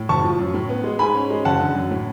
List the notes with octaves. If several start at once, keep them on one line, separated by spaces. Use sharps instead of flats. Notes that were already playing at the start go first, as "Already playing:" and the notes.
Already playing: A2
F#1 A5 C#6
F3
F#2
A2
B3
G#3
G#2 G#5 B5
C#4
G#3
F#1 F#5 A5
D3
F#2
A2